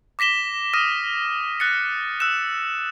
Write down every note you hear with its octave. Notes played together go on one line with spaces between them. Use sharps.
D6 A#6 B6 E7 G7
D#6 F6 A#6 D#7
F#6 A6 C#7
E6 F#6 E7